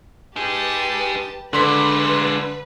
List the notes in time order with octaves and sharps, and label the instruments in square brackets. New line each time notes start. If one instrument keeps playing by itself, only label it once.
[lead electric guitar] D#4 G#4 [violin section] G4 B4 A5
[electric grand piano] D3 C6 B6 [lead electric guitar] G#3 D4 [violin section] B4